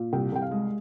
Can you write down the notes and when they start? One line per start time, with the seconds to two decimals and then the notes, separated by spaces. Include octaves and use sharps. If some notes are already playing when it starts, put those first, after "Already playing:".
Already playing: A#2
0.13 C2 G5
0.32 C2 G5
0.42 F5
0.51 G#3